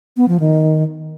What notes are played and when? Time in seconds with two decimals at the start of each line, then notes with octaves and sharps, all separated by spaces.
0.17 B3
0.28 F3
0.40 D#3